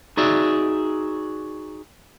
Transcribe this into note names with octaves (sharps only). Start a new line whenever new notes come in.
D#4 F#4 G#4 D5 E5